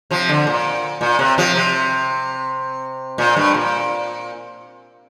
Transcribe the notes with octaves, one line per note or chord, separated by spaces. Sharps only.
C3 F3
D3
A#2
A#2
C3
C3 F3
C3
A#2
G2
A#2